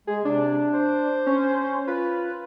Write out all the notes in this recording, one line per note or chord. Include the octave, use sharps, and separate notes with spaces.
G#3 G#4
C3 D4
C5
C#4
F4 B4